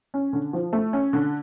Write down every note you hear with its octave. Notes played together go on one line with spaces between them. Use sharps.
C#4
D3
F3
A3
C#4
D3